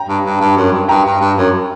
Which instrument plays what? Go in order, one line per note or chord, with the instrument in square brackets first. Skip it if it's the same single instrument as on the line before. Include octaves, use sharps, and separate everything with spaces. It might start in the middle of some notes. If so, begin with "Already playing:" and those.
Already playing: [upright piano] G5 A#5
[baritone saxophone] G2
G2
G2
F#2
G2
[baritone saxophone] G2 [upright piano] G5 A#5
[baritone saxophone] G2
G2
F#2